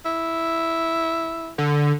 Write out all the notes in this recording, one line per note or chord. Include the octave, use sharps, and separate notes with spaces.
E4
D3